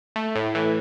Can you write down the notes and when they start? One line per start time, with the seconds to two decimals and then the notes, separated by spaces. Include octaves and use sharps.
0.16 A3
0.36 A2
0.55 E3